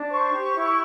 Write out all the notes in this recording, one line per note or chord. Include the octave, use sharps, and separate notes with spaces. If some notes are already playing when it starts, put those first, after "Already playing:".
Already playing: D4
C5 C#6
G4
E4